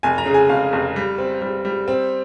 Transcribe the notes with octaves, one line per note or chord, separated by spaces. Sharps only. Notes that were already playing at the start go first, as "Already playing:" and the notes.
F1 G#5
A#5
C#3
G#5
F1 F5
F1
G3
C4
G3
G3
C4